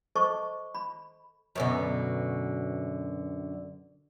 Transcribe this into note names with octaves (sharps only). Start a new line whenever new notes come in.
A4 C5 D#5 A5 C#6 D6
B5
F#2 B2 D3